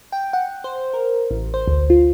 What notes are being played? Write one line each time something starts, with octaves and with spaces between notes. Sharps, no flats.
G5
F#5
C5
A#4
A1
C5
D2
F4